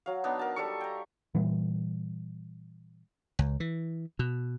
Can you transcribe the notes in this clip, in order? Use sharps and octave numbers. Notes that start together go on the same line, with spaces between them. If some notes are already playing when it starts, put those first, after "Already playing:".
F#3 F5
B3 D4 D#4
A#4 A5
G3 A4 C#6
G5 A#5
A#2 E3 G3
C#2
E3
B2